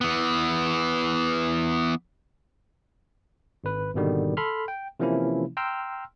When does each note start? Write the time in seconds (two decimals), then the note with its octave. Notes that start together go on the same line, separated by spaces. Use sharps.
0.01 E3 B3
3.64 G#1 B4
3.95 G#1 B2 D3 D#3 G3
4.37 A4 B5 C6 F6
4.68 G5
5.00 C3 E3 F3 A#3 C#4 E4
5.57 G5 A#5 C6 E6 F6